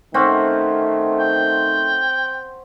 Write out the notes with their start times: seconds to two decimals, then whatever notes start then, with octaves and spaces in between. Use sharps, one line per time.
0.14 D#3 A3 C4 C#4 F#5
1.20 G5